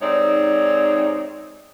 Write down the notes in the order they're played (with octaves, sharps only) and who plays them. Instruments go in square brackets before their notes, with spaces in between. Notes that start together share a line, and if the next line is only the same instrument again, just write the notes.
[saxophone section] G#2 C3 C4 D#4 C#5 D5